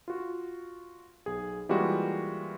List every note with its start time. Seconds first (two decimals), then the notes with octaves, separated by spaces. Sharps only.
0.08 F4 F#4
1.26 B1 G#4
1.69 E3 G3 G#3 A#3 F4 F#4